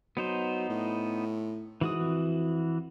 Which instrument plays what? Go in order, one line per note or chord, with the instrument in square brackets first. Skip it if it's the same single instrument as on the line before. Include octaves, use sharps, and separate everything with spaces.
[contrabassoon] F#3 [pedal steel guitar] B3 D#4 C5
[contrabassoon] A2
[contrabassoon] G#2 [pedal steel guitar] E3 F#4 D#6
[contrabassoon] F2